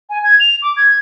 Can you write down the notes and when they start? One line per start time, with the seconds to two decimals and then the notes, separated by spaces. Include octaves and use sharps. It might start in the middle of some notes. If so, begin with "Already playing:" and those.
0.10 G#5
0.24 G#6
0.40 F7
0.62 D6
0.77 G#6